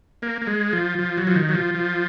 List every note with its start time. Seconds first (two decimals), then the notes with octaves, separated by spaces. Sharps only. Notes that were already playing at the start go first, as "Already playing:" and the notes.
0.22 A#3
0.42 A#3
0.47 G#3
0.73 F3
0.99 F3
1.17 F#3
1.27 F3
1.36 D#3
1.49 F#3
1.55 F3
1.75 F3